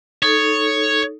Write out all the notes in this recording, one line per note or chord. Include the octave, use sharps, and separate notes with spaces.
D#4 A4 C#5